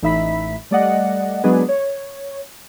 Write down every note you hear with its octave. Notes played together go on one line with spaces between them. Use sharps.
A1 D#4 E5 B5 B6
G3 A3 D5 D#5 F#5
F#3 G#3 B3 D4 G#4 B4
C#5